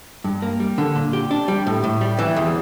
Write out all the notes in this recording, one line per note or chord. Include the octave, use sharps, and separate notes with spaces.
G2
A#3
G3
D3
A#2
G4
D4
G3
A2
A2
G3
E3
E2